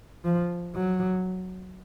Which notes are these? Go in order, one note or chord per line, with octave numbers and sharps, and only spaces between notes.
F3
F#3